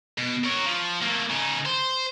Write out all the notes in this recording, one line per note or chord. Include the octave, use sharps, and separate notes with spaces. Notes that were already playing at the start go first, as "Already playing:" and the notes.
B2
A#4 C#5
F3
A3 A#3
C#3 D#4
C5